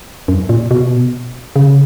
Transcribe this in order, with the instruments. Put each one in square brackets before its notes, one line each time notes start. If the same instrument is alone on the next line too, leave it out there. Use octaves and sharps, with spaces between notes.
[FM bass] F#2
A#2
B2
C#3